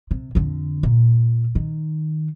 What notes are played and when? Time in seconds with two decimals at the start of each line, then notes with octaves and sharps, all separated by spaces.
0.11 C3
0.35 F2 D3
0.83 A#2
1.55 D#3